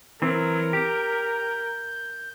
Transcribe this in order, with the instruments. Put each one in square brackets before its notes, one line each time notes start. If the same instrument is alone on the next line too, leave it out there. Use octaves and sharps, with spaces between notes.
[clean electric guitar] E3 C4 [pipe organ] F#3 [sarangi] A#4
[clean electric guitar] G4 [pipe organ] G6